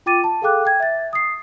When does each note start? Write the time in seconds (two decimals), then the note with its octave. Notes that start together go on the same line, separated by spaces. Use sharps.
0.06 F4 G5 D6 A6 D#7
0.24 A5
0.42 G#4 A4 F5 G5 D6 F#6
0.65 G5 G#6
0.80 E5 A6
1.13 D#6 C7